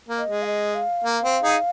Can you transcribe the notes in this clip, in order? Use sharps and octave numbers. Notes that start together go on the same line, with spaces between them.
A#3
D#5
G#3
F5
D#5
F5
A#3
C4
D#4 G#4